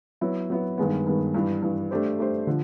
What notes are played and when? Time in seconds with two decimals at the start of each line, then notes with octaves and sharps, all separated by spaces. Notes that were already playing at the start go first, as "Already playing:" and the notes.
0.21 F#3 B3 E4
0.50 F#3 B3 E4
0.78 G2 D#3 G#3 B3
1.06 G2 D#3 G#3 B3
1.34 G2 E3 G3
1.62 G2 E3 G3
1.91 A3 D4 G4 C5
2.19 A3 D4 G4 C5
2.47 D3 F3